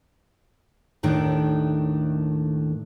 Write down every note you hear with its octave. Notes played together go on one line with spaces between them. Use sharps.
D#2 A2 D#3 A3 D4